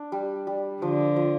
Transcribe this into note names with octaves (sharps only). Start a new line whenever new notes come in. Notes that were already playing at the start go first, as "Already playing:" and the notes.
Already playing: D4
G3
G3
D3 F3
F3